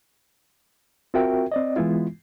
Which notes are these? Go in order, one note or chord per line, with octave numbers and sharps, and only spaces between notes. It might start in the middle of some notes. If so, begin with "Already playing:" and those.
C4 F4 F#4 A#4 E5 G5
C4 D5 D#5
E3 G#3 B3 E4 F4